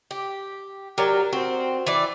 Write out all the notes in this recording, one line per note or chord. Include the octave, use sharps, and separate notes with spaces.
G4
F#3 G4 A#4 D5
C4 F#4 C5
E3 D5